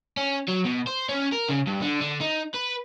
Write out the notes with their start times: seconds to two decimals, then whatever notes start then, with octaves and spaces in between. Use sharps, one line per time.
0.17 C#4
0.48 F#3
0.65 B2
0.87 C5
1.09 C#4
1.33 A#4
1.49 C#3
1.67 G2
1.82 D3
2.01 D3
2.21 D#4
2.54 B4